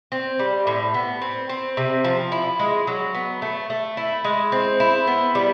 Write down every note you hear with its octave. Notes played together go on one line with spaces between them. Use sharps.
C4
G3
A2
B3
C4
C4
C3
F3
E4
G#3
F#3
B3
A3
A3
E4
G#3
C4
E4
B3
G3